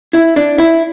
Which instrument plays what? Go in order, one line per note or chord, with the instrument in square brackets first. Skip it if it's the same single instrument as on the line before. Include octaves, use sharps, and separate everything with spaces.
[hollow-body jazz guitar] E4
D4
E4